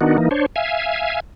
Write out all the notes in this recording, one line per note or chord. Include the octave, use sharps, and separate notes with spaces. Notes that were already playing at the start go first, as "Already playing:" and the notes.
D#3 B3 D4 D#4 F#4
E3 A#3 D#4
D4 C5 C#5
E5 F5 G#5